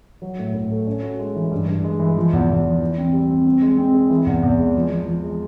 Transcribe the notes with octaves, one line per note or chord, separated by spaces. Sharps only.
F#3
A2
A2
A3
C#4
F#4
G#3
E3
G2
G2
G#3
E3
F3
E2
E2
F3
E3
C4
G3
C4
C4
G#3
C4
G#4
E3
E2
E2
G#3
F3
F3
F3
G#3